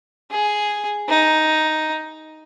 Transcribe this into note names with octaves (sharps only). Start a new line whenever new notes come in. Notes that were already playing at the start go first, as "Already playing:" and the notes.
G#4
D#4